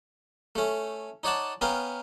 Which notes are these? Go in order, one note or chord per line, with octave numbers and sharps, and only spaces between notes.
A3 C#4
D#4 C#5 D5 F#5 A5
B3 C#4 A#4 F5 G5